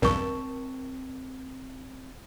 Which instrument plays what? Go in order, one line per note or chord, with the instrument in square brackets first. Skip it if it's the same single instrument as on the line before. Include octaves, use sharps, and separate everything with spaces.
[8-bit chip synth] B1 E2 G2 [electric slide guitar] C4 A5 [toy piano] A#4 C#6